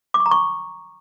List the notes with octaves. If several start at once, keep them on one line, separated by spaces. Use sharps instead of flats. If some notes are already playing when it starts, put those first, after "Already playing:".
D6
C#6
A#5
C#6